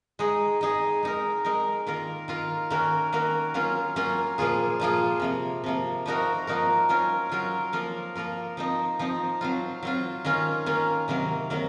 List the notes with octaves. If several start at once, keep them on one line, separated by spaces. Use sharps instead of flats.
G#3 D#4 G#4
G#3 D#4 G#4
G#3 D#4 A#4
G#3 D#4 A#4
D#3 A#3 F4 A#4
D#3 A#3 F4 A#4
D#3 A#3 C#4 F#4 A#4
D#3 A#3 C#4 F#4 A#4
F#3 A#3 C#4 F4
F#3 A#3 C#4 F4
A#2 F3 A#3 F4 G#4
A#2 F3 A#3 F4 G#4
C3 F3 A#3
C3 F3 A#3
F3 A#3 D#4 F#4 A#4
F3 A#3 D#4 F#4 A#4
F#3 C#4 F4 A#4
F#3 C#4 F4 A#4
F3 A#3 F4 A#4
F3 A#3 F4 A#4
F3 C4 D#4
F3 C4 D#4
F#3 C4 F4
F#3 C4 F4
D#3 A#3 C#4 F4
D#3 A#3 C#4 F4
C3 D#3 F#3 A#3
C3 D#3 F#3 A#3